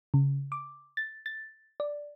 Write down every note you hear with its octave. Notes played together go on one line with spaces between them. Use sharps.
C#3
D6
A6
A6
D5